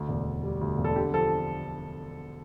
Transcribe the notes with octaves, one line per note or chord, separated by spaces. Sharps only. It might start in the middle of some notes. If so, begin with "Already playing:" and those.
Already playing: D2
E1
E1
G3
D2
E1
A4
D3 G4
F3 A4